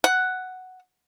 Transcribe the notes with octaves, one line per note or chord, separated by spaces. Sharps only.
F#5